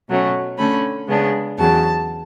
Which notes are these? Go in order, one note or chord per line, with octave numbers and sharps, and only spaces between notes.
B2 F#3 A3 C#4
D3 A3 C#4 B5
C#3 G#3 B3 D4
E2 C#3 F#3 A5